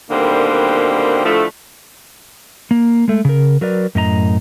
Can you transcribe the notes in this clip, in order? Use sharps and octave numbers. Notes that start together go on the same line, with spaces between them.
B2 D3 D#3 G3 A#3 C4
A2 D3 F3 A3
A#3
G#3 A3
C#3 A#4
F#3 A#4 B4 D5
F#2 A2 D#5 A#5